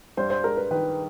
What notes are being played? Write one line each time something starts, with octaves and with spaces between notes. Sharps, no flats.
G2 C5
C5
G#3 A#4
B4
D#3 B4